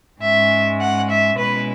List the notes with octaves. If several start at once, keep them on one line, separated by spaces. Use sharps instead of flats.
G#2 G#3 C#4 E5
F#5
E5
B2 G#3 C#4 E4 B4